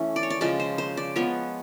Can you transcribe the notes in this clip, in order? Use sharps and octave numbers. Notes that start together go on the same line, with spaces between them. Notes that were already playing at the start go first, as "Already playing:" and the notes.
Already playing: E3 A3 C#4
D5
C#5
D5
C#3 F3 G#3 D5
C5
C5
D5
F3 G#3 B3 C#5